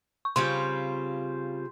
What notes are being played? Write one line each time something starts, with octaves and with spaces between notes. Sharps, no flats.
C#6
C#3 G3 C4 F4 C6